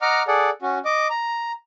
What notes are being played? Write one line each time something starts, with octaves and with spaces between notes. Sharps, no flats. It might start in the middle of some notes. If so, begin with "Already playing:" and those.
D#5 F#5 A#5 D6 F6
G#4 A4 D5 F#5
C#4 F#4
D#5 D6
A#5